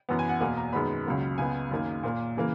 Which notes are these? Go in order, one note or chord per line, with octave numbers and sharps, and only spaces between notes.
F#2 E3 B3
G#5
F#5
E2 B2 A#3 G#5
A#5
F#2 D#3 G#3 B3 B5
C#2 C#3 F#3 A#3
C#2 C#3 G#3 B3 G#5
F#2 D#3 A#3
A#2 A#3
C#3 E3 A#3